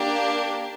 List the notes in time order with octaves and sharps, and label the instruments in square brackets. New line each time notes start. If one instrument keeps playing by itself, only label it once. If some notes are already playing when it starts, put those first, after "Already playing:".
Already playing: [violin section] A#3 D4 G4